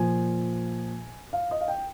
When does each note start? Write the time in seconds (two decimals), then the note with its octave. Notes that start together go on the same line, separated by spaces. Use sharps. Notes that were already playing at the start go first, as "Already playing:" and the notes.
Already playing: A#2 F3 G#5
1.33 F5
1.51 D#5
1.61 F5
1.68 G5